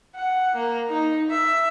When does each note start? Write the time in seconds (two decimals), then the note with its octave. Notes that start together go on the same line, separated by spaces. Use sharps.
0.15 F#5
0.55 A#3
0.89 D#4
1.30 E5